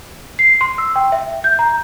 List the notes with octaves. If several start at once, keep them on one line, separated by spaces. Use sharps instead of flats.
C7
C6
E6
G5
E5
G6
A#5